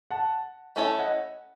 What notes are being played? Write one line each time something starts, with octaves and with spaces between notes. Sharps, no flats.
F#5 A5
A3 C#4 E4 A4 C#5 E5 G#5
D#5 F#5